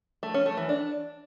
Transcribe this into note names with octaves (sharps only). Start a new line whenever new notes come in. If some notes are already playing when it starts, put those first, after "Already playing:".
A3
C#4
A3
E3
D4